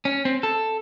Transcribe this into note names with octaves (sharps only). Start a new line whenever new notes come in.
C#4
C4
A4